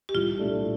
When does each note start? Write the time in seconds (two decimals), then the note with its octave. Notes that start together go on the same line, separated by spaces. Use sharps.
0.09 G4
0.14 C2 F4
0.38 A#2 A3 D4 A4